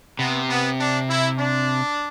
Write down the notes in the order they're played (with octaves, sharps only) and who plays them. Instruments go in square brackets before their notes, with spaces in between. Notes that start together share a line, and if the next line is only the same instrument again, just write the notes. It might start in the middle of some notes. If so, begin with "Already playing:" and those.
[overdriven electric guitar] C3 [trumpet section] B3
[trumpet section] B3
D4
E4
D4